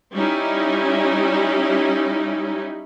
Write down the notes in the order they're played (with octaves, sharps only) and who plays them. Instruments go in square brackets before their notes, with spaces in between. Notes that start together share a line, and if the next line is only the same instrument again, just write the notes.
[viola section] G3 C#4 D#4 E4